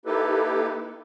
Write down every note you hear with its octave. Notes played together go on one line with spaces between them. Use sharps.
A#3 D#4 E4 G4 A4 B4